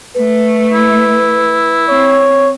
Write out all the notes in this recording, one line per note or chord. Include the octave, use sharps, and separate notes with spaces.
A3 B4
E4
C4 C#5